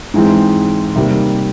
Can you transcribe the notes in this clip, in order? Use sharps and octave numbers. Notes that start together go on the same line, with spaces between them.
G#2 E3 G#3 C4
C3 D#3 G3 A#3